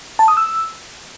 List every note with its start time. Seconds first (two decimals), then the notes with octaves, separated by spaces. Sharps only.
0.19 A5
0.28 D#6
0.37 E6